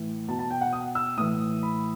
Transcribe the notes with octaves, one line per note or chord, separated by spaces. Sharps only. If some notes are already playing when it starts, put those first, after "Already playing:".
Already playing: A2 E3
B2 A5
A5
G5
F#5
D#6
E6
A2 E3 D#6
B5